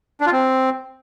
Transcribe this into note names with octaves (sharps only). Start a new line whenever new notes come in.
D4
F4
C4